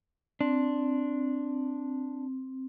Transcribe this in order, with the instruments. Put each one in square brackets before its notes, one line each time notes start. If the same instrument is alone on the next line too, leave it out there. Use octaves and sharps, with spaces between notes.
[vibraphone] C4 [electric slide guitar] D4